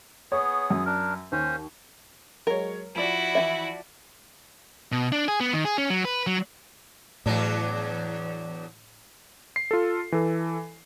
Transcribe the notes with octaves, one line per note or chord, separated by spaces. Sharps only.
B3 G#4 C#5
F#2
D4 A#4
D#2 C#4 C5
F#3 G#3 A#4 C#5
F3 E4 F#4 D5
E3 C#4 E5
B2
D4
G#4
B3
D#3
G#4
C#4
F#3
B4
F#3
E2 A2 F#3 D4
C7
F4 A4
E3 A4